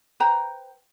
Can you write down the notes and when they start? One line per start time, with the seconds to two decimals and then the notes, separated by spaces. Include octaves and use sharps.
0.20 B4 C5 G5 A#5